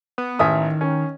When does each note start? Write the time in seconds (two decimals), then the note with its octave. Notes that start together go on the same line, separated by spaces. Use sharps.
0.18 B3
0.39 A1 D#3 E5 D#6
0.81 C#4